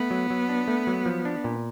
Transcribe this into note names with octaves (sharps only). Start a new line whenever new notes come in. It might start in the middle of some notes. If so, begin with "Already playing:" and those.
Already playing: A3 B3
F#3
F#3
D4
A3
F#3
F3
D4
A#2